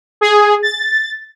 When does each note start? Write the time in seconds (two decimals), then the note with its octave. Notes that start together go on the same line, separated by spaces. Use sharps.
0.21 G#4
0.63 A6